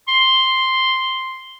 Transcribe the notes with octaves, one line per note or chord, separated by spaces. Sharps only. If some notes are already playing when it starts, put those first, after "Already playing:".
C6